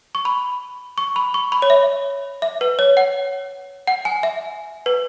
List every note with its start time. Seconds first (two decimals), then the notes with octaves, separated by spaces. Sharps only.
0.15 C#6
0.25 B5
0.98 C#6
1.16 B5
1.34 C#6
1.52 B5
1.62 C#5
1.70 E5
2.42 E5
2.61 B4
2.79 C#5
2.97 F#5
3.87 F#5
4.05 G#5
4.23 E5
4.86 B4